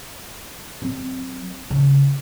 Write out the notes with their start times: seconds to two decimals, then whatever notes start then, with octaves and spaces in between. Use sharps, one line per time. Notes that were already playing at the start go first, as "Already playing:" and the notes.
0.82 F#3 C4
1.70 C#3